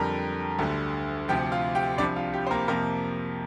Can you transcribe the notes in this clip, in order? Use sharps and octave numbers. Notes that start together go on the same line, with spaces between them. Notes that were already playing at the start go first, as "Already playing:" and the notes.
Already playing: F2 D3 G3 A#4 A#5
D2 D3 G3
D2 C3 F3 G4 G5
F4 F5
G4 G5
C2 C3 F3 D4 D5
F4
G4
C5
A#3 A#4
F2 C3 F3 A#3 A#4